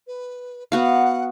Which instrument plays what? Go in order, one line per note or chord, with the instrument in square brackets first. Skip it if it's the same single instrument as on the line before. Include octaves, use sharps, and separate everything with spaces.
[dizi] B4
[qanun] B3 F#4 F5 [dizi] F#5